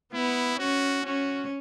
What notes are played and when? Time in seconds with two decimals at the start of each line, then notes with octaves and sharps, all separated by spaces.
0.14 B3 E4
0.59 C#4 F#4
1.06 C#4 F#4